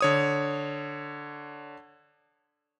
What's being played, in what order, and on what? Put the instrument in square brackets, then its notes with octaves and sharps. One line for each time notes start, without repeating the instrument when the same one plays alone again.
[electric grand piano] D3 C#5 D#6